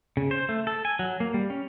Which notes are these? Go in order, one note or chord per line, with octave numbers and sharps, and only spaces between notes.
C#3
C5
A3
A4
G#5
F#3
A#3
G3
C#4